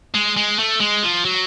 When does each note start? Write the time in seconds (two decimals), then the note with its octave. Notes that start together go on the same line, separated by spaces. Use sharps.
0.15 G#3
0.37 G#3
0.59 A3
0.81 G#3
1.03 F3
1.25 F#3